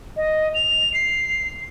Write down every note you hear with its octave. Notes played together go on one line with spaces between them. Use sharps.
D#5
F7
C7